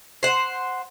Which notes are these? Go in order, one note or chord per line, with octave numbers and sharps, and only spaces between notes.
C5 F#5